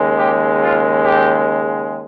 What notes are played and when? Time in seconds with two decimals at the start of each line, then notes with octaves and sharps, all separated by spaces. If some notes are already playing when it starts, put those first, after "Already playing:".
Already playing: D#2 C#3 G#3
0.17 G4
0.60 F4
1.03 G4